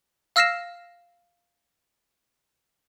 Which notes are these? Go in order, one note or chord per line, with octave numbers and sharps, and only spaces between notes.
F5 E6 F6 A#6 C7 E7